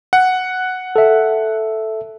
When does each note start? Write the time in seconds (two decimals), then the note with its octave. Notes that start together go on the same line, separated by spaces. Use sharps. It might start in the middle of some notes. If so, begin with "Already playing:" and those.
0.13 F#5
0.96 A4 E5